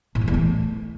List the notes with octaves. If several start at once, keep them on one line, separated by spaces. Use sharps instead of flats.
A2
F2
E2
A3